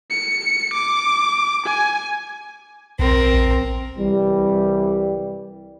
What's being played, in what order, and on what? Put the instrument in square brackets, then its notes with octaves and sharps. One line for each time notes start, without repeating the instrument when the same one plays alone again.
[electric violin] C#7
D6
G#5
[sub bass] B1 [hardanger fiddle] C4 A#4
[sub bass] A#1
[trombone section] C2 E3 G3